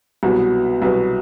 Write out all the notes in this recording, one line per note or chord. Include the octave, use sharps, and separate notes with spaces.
C2 B2 F#3 B3
C2 B2 F#3 B3